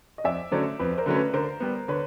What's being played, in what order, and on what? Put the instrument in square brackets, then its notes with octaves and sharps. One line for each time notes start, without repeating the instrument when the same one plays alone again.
[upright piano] D#5
[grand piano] F2 [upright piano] D5 E5
[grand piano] D3 F#3 A3 C#4 [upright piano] C5 D5
[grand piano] F2 [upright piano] B4
[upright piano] A#4 C5
[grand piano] D3 F#3 A3 C#4
[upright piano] B4
[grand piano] D3 [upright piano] A#4 C5
[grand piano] G3 B3
[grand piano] D3 [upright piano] B4 C#5